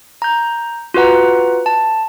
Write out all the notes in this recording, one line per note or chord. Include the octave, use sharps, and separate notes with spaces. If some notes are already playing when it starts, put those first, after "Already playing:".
A#5 G6
F4 F#4 B4 F#5 A#5
A5